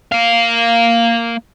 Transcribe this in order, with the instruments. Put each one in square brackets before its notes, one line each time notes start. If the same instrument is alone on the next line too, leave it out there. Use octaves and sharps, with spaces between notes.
[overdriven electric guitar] A#3 F5